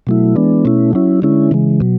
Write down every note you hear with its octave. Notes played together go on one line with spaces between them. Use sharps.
B2 F#3 A3 E4
E3 G#3 B3 D4
B2 A3 C#4 E4
F#3 C#4 E4
D3 G#3 C#4 E4
C#3 E3 G#3
B2 F#3